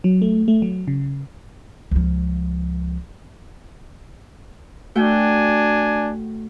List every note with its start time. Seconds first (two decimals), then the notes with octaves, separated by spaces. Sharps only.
0.04 F#3
0.22 A3
0.48 A3
0.62 F#3
0.88 C#3
1.91 C#2 F3
4.95 A3 D4 F#4 G5 G#5